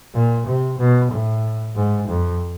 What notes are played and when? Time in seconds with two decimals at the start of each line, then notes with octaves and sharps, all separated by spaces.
0.14 A#2
0.47 C3
0.79 B2
1.12 A2
1.76 G#2
2.08 F2